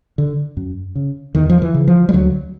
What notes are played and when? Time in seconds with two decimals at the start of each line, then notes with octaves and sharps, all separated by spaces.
0.18 D3
0.57 F#2
0.95 C#3
1.35 E2 D#3
1.49 F3
1.62 E3
1.74 C#3
1.87 F3
2.09 G3
2.13 D2 F#3